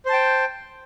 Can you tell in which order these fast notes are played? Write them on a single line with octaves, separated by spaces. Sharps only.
C5 A5 G5